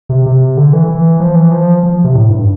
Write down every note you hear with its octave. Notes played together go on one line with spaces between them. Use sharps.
C3
C3
D3
E3
E3
F3
E3
F3
F3
C3
A2
G2